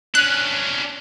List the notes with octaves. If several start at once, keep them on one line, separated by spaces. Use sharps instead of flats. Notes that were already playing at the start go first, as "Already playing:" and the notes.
C#4 D4 F#6